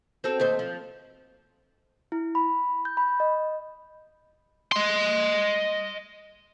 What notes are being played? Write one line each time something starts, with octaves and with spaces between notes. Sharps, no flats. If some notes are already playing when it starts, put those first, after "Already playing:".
C4 F#4 A4
D#2 A3 C5
F3
E4
B5
G6
B5
D#5
D#5 C6